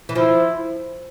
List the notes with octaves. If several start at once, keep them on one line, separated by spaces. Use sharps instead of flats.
E3
F3 E4